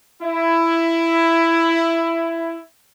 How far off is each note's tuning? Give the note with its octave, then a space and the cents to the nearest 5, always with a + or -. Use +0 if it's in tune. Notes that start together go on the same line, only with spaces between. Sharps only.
E4 +10